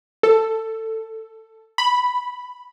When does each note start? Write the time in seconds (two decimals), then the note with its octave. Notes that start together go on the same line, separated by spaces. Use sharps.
0.23 A4
1.78 B5